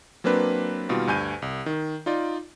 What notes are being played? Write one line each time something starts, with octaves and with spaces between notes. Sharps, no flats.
F#3 A#3 C4 D4 B4
B2 D#3 G3 A#3 F4
D2 G2 G#5 G6 D#7
C2
D#3
D#4 F4 D5